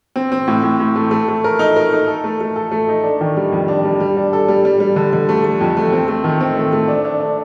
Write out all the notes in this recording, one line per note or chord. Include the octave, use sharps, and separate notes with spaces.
C4
C4
A2
A2
A2
A3
A3
A3
A#4
D#4
A#4
D#4
A4
A3
A3
A4
A3
D#4
D4
D#3
G3
F2
D4
G3
G3
D4
A4
G3
G3
G3
D3
D3
A3
A3
F2
A3
C4
A3
D#3
C4
A3
A3
D4
D4
D4